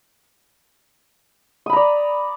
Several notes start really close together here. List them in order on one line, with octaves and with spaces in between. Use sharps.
D#6 B5 A#5 D5